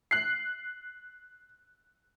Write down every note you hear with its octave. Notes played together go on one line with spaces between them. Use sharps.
F#6 C7